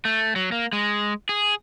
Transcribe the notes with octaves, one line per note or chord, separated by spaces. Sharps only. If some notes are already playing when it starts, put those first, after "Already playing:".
A3
F#3
A#3
G#3
G#4